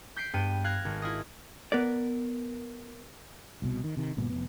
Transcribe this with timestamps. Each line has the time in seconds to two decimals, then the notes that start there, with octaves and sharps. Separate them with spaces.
0.16 G6 B6 C7 D7
0.34 G2 B3 G5 D7 D#7
0.64 F5 F#6 G#6 A#6
0.85 G#1
1.02 E4 F4 D#5
1.72 B3 A#4 D5
3.62 C2 B2
3.84 D#3
3.97 C3 D#3
4.17 G1 G2 A#2 B3
4.30 F1 G2 B3